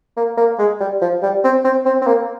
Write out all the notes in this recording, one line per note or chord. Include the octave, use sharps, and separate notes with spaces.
A#3
A#3
G#3
G3
F3
G3
C4
C4
C4
C4
A#3